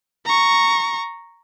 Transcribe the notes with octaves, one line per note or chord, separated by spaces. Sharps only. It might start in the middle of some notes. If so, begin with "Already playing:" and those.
A#5 C#6